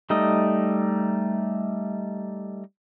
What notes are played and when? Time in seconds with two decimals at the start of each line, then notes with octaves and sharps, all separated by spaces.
0.10 G3 A3 D#4 D#5